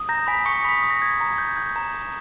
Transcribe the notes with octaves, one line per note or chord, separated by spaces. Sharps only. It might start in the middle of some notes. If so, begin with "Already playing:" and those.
Already playing: D#6
A#5 G6 A#6
G#5 B5 B6
C#6 D#6 C#7
B5 D#6 B6
D#6
A#6
D#6 G#6
A#5
G6
G6
A#5
A#5